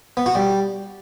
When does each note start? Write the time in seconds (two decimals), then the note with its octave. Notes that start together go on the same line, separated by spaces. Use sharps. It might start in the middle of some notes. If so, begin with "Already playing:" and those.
0.17 B3
0.26 F#4
0.35 G3